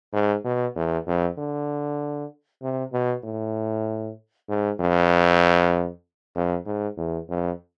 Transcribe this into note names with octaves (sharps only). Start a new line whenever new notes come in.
G#2
B2
E2
F2
D3
C3
B2
A2
G#2
F2
F2
G#2
E2
F2